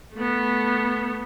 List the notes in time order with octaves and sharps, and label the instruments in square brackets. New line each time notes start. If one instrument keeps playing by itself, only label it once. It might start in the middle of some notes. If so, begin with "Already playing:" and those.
[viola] A3 B3